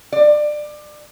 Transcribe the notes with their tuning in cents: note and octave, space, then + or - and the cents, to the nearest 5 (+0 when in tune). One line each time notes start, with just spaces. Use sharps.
D5 +25